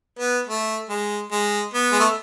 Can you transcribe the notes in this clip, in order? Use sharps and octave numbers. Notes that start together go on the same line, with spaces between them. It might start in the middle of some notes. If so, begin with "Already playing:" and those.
B3
A3
G#3
G#3
B3
G#3
A3